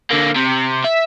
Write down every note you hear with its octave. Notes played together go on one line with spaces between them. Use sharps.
D3 A#3
C3
E5